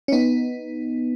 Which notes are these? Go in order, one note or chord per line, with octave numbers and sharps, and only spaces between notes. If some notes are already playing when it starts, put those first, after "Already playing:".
C#4
B3 D#4